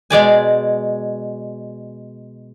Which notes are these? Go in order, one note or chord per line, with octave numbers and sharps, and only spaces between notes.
B2 G#3 D5 G#5